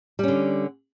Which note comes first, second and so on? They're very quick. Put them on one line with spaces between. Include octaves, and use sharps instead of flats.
G3 C#4 D3